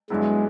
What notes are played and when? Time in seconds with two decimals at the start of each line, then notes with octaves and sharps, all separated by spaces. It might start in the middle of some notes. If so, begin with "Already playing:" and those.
0.10 G2 D3 F#3 G#3 B3 E4